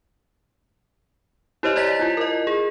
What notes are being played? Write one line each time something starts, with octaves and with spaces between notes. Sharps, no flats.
E4 G4 C5 C#5 D#5
D5 D#5 A#5 A6 B6
E4 F4
A#4 D#5
G#4